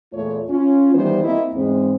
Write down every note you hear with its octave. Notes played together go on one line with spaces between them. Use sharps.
E2 A#2 A3 F4 C#5
C#4 F4
D#3 E3 G3 B3 E4 C5
A#3 C4 E4 D#5
E2 G#2 G#3 C4